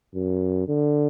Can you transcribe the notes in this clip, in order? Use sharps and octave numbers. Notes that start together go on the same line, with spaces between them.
F#2
D3